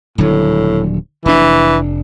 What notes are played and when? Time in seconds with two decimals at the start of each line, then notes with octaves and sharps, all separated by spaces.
0.18 D#1 A2 D3 F#3
1.26 F1 E3 D4